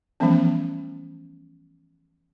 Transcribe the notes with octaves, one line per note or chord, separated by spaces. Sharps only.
E3 F3 G3 A3 B3 C#4